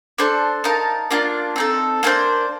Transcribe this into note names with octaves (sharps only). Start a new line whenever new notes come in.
D4 A4 C5
D#4 A#4 F5 A5
A#3 D4 F4
C4 D#4 A4
A#3 D4 A4 C5